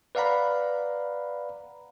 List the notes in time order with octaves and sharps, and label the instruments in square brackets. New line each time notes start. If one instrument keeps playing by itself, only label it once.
[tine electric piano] B4 D5 F5 F#5 A#5 B5